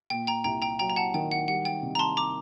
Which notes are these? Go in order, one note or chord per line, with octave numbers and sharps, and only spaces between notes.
A#2 G5
G5 A#5
C2 G5 A#5
G5 A#5
F#3 G5 A#5
A#5
F#5 A5
D#3 G5
F#5
G3 F#5
G5
C3
A#5
A5 C6
A#5 D6